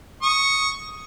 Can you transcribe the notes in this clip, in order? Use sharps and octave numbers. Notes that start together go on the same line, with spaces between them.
C#6 D#6